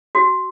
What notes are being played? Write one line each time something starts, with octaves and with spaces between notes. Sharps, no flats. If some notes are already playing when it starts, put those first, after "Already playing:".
F#4